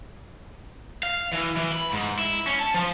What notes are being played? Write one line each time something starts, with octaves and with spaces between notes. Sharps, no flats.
F5
E3
E3
B5
G#2
E4
C#4
A5
F3